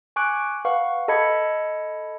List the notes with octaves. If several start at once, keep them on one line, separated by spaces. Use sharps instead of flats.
G#5 C#6 D6 F#6 D7
B4 F5 F#5 C#6
A4 D#5 A5 B5 G#6 C#7